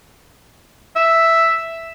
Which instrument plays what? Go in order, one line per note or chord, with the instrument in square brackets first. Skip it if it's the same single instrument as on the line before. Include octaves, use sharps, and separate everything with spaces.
[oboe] E5